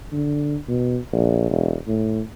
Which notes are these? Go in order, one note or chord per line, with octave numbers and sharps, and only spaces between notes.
D3
B2
A#1
E1
A2